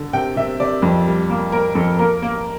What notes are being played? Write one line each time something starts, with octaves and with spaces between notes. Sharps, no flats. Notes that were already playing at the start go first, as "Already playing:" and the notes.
Already playing: D3
C3 G5
C3 E5
C3 D5
F2
G3
A#3
A#3 A#4
F2 A4
A#3 A#4
A#3